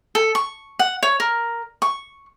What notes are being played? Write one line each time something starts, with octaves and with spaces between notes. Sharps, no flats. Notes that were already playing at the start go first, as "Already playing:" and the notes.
A4
C#6
F#5
C#5
A#4
C#6